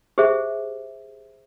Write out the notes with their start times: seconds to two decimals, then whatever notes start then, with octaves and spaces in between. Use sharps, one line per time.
0.18 G4 G#4 C5 E5